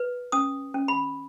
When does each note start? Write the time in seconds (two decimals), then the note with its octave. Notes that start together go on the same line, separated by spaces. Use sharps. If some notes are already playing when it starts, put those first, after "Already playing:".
Already playing: B4
0.32 C#4 D#6
0.74 C#4
0.88 B5